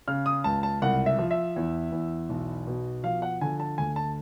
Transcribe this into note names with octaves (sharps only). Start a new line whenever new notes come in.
C#3 F6
D#6
C#2 A5
A5
C2 F#5
E5
F3
E5
E2
E2
B1
B2
F3 F5
F#5
D3 G#5
A5
D2 G#5
A5